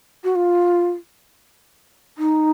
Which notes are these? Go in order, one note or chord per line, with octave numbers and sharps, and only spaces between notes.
F#4
F4
D#4